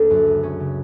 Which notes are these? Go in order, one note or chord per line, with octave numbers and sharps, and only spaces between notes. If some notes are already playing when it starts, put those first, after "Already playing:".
Already playing: D2 A#3 D4
F#2
C#2
C#4
C#3